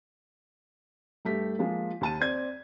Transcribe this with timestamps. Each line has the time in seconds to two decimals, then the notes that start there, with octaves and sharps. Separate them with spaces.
1.25 G2 A3 G4 B6
1.59 F3 G#3 A#3 F4
2.01 D#2 A5 D#7
2.20 C4 D5 G#6